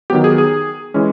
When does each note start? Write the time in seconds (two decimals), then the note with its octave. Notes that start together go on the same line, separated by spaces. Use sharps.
0.10 D#3 F#3 B3 G4
0.24 G#4
0.38 G#4
0.94 E3 G#3 C#4